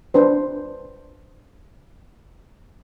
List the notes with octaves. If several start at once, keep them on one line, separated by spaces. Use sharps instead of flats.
D4 B4 C5